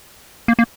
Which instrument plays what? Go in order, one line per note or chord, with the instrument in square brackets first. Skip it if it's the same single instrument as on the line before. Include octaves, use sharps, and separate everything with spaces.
[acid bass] A#3
A#3